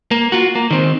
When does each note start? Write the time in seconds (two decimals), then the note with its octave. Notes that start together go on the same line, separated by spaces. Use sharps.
0.11 A#3
0.32 F4 F#4
0.55 A#3
0.71 D#3 C4